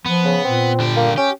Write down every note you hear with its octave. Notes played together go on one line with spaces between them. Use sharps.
F3 B3
C#3
A#2 C4
D3 G4
A#3
C#4 G4